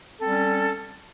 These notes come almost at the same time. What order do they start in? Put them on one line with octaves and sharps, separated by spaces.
A4 C4 G3 C#4